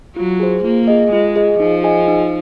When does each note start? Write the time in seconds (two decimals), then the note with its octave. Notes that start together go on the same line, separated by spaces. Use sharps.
0.16 F#3 F4
0.40 G#4 C5
0.64 A#3 F4
0.88 G#4 D#5
1.12 G#3 F4
1.36 G#4 D#5
1.59 F3 D#4
1.84 G#4 D#5 G#5
2.08 D#4